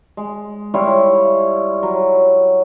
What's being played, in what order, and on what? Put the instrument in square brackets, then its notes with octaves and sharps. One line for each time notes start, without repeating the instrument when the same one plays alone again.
[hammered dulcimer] G#3
G3 E4 F4 C#5
F#3